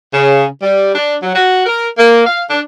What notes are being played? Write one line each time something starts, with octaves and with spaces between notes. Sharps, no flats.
C#3
G3
D4
F#3
F#4
A#4
A#3
F5
D4